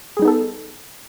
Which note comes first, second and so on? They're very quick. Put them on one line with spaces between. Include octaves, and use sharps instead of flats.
G#4 G3 D#4 B3 A4